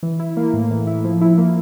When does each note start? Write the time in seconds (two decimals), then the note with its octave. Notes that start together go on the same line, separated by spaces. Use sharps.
0.03 E3
0.20 E4
0.37 A#3
0.53 A2
0.71 E3
0.87 E4
1.04 F3
1.21 E4
1.38 A#3